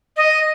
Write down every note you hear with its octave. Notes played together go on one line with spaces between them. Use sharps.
D#5